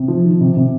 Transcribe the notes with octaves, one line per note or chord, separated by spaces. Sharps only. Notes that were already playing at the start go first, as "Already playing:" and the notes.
Already playing: C3
F3
D#3
C3
C3